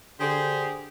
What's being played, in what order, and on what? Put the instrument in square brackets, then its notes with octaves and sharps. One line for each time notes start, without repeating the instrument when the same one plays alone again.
[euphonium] D3 [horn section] G4 G#4 C5